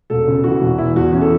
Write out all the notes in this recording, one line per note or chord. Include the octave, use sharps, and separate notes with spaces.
E1 A4
C#3
E3 F#4
E1
E3 E4
E2 F#4
E3 C#4
A4